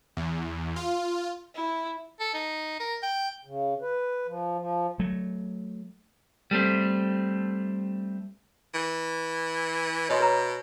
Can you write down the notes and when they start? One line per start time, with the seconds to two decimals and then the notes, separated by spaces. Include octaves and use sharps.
0.17 E2
0.76 F4
1.55 E4
2.20 A4
2.34 D#4
2.80 A#4
3.03 G5
3.45 C#3
3.81 B4
4.27 F3
4.59 F3
4.99 F#3 A3
6.51 G3 A3 C4
8.74 E3
10.09 B2 C#5 D#5 C6
10.20 B4 C#5 A#5